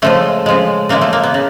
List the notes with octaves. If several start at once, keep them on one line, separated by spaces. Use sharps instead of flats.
C#3 F3 G#3 A3
C#3 F3 G#3
C#3 E3 G#3 A#3
A3
A#3
B3
C#3